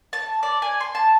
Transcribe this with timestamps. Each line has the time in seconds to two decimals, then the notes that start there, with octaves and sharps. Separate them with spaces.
0.13 A5
0.43 D5
0.62 G#5
0.80 C6
0.95 A5